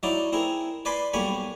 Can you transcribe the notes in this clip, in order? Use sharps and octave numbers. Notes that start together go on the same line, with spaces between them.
F#3 D#4 E4 D5
C4 E4 G#4 A#4
B4 D5 G#5 B5 C6
B1 G3 A#3 G#5 B5 C#6